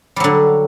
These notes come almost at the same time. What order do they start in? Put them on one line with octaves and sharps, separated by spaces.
G3 F#3 D3